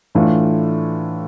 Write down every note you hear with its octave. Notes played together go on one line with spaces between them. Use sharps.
A2 E3 A3 D4 F4